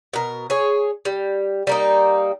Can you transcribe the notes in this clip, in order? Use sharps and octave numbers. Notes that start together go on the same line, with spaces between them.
B2 A#4
G#4 C#5
G3
G3 A#3 D#4